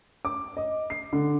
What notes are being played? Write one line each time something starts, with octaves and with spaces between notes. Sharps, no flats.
D6
D#5
C7
D3